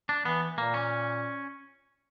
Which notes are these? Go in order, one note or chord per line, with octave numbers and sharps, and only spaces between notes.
D4
E3 B3
A#2 A#3
C#4